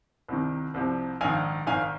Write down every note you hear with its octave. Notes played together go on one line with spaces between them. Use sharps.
C2 C3 D#3
C2 C3 F3
A#1 G#2 D#3 F5 G#5
G#1 G#2 D#3 F5 G#5